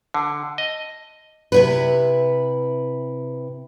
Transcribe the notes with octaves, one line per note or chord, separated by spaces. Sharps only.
D3
D#5
C3 E4 B4